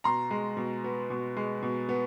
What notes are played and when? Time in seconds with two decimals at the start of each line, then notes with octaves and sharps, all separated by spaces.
0.04 B2 A#5 C6
0.30 G#3
0.57 B2
0.84 B3
1.10 B2
1.37 G#3
1.63 B2
1.89 B3